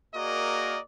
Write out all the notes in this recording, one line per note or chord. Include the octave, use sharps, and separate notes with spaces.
A#3 F#4 G#4 A#4 D5 D#5